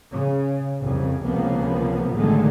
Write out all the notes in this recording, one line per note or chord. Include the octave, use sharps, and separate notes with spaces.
C#3
C2 F2 C#3
C#2 C3 F3 A#3 B3
A1 D3 D#3 F#3 G#3 A3